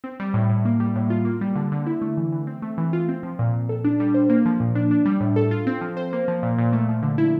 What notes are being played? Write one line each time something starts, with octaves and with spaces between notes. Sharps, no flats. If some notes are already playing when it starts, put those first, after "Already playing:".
C4
G3
A2
A2
A#3
G3
A2
F4
A#3
G3
D3
D3
E4
A3
E3
E3
C4
A3
E3
F4
C4
F3
A#2
A#2
A4
D4
G3
C5
A#3
F3
A#2
D4
D4
G3
A2
A4
F4
C4
F3
C5
A#3
F3
A#2
A#2
A3
F3
D3
E4